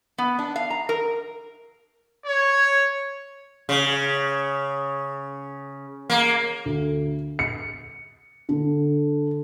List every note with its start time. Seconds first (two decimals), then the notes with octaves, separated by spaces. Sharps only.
0.18 B3
0.39 D4
0.56 F5
0.70 A#5
0.89 A#4
2.26 C#5
3.69 C#3
6.10 A#3
6.65 D2
7.39 C#7
8.49 D3